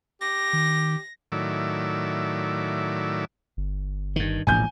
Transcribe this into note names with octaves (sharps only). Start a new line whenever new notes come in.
G4 A#6
D#3
A2 D#3 F#3 D5 E5
G1
G2 D#3
E1 A#1 A2 G#5 G6